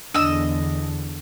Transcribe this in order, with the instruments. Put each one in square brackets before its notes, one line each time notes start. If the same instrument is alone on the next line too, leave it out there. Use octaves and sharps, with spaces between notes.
[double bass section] E2 D3 [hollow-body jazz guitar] D4 [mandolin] D#5 E6